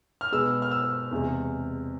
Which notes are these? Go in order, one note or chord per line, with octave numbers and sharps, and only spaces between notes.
F6
B2 G#3 B3 E6
F6
E6
E2 C3 G#3